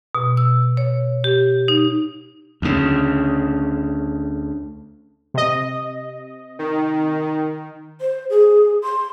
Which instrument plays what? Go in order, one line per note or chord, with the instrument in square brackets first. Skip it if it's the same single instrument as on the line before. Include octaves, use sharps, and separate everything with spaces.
[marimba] B2
E6
C#5
G4
D#4
[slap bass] D2 C#3
[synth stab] C3 D#5
[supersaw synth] D#3
[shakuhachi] C5
G#4
C6